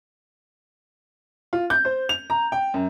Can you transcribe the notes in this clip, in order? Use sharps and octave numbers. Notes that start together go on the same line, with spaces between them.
F4
G6
C5
F7
A#5
G5
F#2